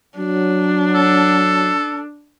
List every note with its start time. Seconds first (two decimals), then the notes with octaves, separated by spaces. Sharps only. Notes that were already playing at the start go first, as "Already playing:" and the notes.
0.17 F#3 D4
0.95 A4